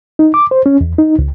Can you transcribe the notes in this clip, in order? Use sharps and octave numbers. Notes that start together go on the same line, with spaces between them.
D#4
D6
C5
C#4
E2
D#4
C#2